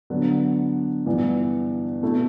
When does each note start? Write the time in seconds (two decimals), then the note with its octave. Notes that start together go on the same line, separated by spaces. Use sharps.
0.10 D3 F#3 B3
1.06 G2 E3 B3
2.03 B2 A3 E4